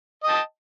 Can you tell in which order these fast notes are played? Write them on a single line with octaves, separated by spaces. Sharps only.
D#5 G5 A5